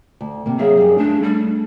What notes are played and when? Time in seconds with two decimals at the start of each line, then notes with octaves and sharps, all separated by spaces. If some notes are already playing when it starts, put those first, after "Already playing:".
0.21 D2
0.46 C3 A#3
0.59 F#3 G#4 E5 F5
0.77 F#2 G3
0.98 A3 D4
1.22 G3